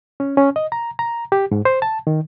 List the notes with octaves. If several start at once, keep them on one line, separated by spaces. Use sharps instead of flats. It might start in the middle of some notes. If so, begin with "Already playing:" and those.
C#4
C#4
D#5
A#5
A#5
G4
G#2
C5
A5
D#3